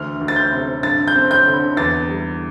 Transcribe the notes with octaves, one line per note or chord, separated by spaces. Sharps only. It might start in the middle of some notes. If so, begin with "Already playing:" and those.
Already playing: D2 E3 F6
D2
A6
G6
C3
G2 A6
G6
C4
G6
D3
E2 A6
G3